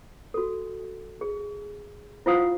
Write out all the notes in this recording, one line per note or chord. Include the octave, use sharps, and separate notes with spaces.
F#4 A4
G#4
E4 F4 C5 F5 F#5 D#6